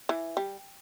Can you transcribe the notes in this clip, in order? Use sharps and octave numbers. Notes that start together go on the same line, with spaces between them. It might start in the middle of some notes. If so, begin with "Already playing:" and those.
E3
G3